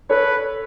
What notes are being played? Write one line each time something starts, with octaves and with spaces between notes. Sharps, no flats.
A4 B4 C#5